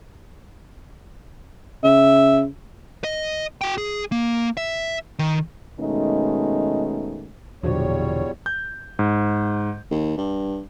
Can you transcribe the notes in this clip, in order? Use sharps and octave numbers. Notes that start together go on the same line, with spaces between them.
C#3 E5
D#5
F#4 G5
G#4
A#3
E5
D#3
B2 D#3 G#3 A3 C#4 D#4
E1 A#1 E2 D3 F#3 G3 C5 C#5
G6
G#2
D#2
G2